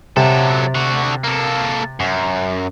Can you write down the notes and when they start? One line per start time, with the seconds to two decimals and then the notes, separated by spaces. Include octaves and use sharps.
0.17 C3 F#3 A4
0.75 D3 F#4
1.24 A#3 A4
2.00 F#2